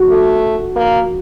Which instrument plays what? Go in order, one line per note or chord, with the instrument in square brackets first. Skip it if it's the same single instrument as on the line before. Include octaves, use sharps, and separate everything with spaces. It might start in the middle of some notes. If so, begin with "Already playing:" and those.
Already playing: [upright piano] F#4
[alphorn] A3
A#3